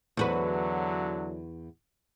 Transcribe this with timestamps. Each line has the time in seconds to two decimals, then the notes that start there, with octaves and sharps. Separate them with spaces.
0.17 E2 D3 F#3 F#4 B4